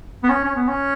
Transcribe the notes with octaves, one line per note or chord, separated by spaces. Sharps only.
B3
C#4
C#4
B3
C#4